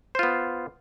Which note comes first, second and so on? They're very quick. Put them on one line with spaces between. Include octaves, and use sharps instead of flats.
C5 F4 B3